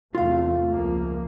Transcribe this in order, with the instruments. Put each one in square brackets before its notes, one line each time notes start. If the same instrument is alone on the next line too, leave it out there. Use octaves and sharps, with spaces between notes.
[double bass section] E2 C3 A3 [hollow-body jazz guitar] F4 F5
[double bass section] C#2 F3 A#3